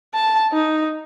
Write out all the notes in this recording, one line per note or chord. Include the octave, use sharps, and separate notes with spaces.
A5
D#4